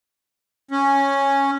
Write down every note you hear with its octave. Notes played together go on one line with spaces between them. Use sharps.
C#4